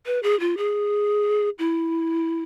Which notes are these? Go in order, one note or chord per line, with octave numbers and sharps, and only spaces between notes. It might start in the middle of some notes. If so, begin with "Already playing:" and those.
B4
G#4
F4
G#4
E4